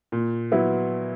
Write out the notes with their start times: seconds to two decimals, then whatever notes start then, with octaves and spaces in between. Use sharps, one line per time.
0.12 A#2
0.52 F#3 B3 E4